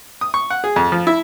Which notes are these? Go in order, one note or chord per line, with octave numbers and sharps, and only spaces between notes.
D#6
C#6
F#5
G#4
F2
F3
E4